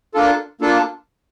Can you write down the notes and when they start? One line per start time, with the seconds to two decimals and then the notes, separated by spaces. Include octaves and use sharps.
0.14 A#3 D4 F4 A4
0.61 A#3 D4 F4 A4